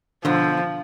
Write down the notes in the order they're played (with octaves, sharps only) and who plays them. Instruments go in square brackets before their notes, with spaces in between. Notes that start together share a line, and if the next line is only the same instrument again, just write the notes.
[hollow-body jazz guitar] B1 D3 [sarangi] F3